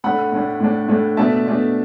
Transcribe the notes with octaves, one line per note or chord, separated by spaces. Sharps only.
A2 A3 D4 F#5 B5
A2 A3 D4
A2 A3 D4
A2 A3 D4
B2 A3 D4 E5 A5
B2 A3 D4